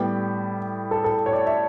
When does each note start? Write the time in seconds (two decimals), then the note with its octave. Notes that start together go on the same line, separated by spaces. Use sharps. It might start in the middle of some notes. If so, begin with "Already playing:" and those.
Already playing: A2 G3 B3 G4
0.91 A4
1.04 A4
1.26 C#5
1.33 D5
1.46 E5